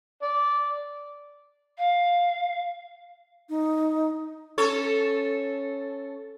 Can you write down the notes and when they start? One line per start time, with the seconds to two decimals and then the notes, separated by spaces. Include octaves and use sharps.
0.22 D5
1.78 F5
3.49 D#4
4.58 C#4 A4 C#5